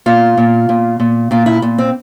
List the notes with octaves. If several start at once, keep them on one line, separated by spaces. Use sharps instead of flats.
A#2 F4
A#2
A#2
A#2
A#2 F4
E4
A#2
C4